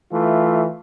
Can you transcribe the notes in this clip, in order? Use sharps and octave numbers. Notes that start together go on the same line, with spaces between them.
E3 A3 F4